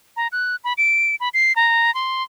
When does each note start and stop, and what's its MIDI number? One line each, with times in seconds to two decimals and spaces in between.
0.17 0.28 82
0.32 0.56 90
0.64 0.73 83
0.78 1.15 98
1.20 1.29 83
1.34 1.55 96
1.56 1.93 82
1.95 2.23 84